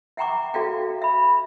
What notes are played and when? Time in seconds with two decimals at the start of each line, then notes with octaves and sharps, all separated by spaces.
0.17 E5 F#5 G5 A#5 C#6 D6
0.54 F#4 A4 D5 E5 F5 G5
1.02 E5 B5